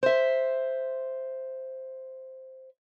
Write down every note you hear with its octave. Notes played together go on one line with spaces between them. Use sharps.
C5 E5